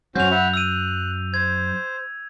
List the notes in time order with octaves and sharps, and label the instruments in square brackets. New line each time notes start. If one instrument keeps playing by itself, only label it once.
[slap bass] F#2 F#3 [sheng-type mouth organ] C#4 F#4 C5 [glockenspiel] G6 F7
[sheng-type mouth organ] E5 F#5 B5
[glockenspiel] E6 D#7 [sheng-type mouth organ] F#6
[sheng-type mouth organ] C5 [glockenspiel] G#6